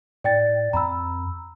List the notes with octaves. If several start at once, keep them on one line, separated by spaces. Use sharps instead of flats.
A2 D5 G5 A6
F2 A#5 B5 E6